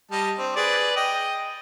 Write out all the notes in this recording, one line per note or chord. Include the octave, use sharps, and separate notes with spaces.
G3 D#5 A5
C4 D4
G#4 B4 D5
D#5 G5